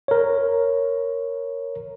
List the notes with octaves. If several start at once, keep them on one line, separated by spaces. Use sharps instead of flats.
A#4 C#5